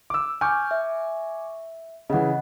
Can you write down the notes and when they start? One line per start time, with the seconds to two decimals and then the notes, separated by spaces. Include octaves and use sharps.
0.10 D6 E6
0.41 G#5 C#6 D6 F6 G6
0.71 E5
2.10 C#3 E3 D#5 F#5